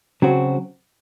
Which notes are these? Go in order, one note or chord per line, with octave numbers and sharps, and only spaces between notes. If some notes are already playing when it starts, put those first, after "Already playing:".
C#3 F#3 C4 F#4